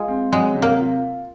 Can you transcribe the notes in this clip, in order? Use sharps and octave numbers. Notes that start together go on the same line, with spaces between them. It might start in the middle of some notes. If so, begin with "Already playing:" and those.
Already playing: G#3 F4
C4
F#3 G#3
C3
A#3
F4